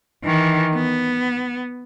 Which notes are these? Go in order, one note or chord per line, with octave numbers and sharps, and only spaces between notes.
D#3 E3
B3